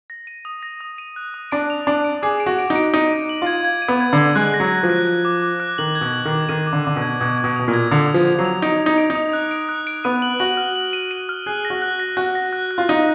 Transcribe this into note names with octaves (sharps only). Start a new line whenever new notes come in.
A#6
D#7
D#6
A#6
D#6
D#7
F#6
D#6
D4 D7
F7
D4 D7
D7
G#4 D6
D7
F#4
D7
D#4
D7
D#4 D#7
D#7
F#7
F4 G#6
G#6
D#7
B3
G#6
D3 G#6
G#3 F#6
A#6
F#3
A#6
F3
F#6
F#6
D6
D6
F#6
D#3 F#7
G#6
B2
F#7
D#3
D6
D#3 D#7
D6
D3
D3 D6
B2
G#6
B2 G#6
G#6
B2
B2 D#6
A#2
G#6
D3 F7
F3 F7
F7
F#3
F7
D#4 D7
D#6
D#4
D7
D#4
D#6
F#6
D7
F#6
D7
B3 D#7
F#7
F#4 F#7
F6
F#7
D#7
D#7
F6
G#4 F#6
A#6
F#4
F#6
A#6
F#4 F#6
A#6
F#6
F#6
F4
D#4 D#7